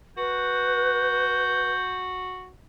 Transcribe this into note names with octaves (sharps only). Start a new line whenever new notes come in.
F#4 B4 G6